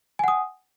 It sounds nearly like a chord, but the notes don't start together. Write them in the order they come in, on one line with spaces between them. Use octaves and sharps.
G#5 F#5 D#6